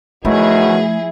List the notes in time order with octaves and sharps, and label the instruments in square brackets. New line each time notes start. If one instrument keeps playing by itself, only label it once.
[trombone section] B2 D#3 F#3 [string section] F3 G#4 [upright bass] A3 [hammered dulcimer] E4